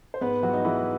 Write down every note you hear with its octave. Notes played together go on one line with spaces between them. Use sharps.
C5
G#2 B3 B4
E3 F#3 G3 F#4
D#4
G#2 E3 E4